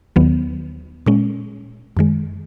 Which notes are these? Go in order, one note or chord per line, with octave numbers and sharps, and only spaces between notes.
D#2 D#3 F#3 B3
A#2 G#3 C#4
F#2 D#3 G#3